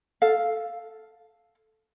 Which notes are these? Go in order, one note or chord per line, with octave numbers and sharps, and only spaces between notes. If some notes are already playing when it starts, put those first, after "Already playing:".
A4 F5